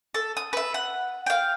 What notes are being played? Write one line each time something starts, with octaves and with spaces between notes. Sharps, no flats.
A4
D#6
B4 E5
F#5
F5 G5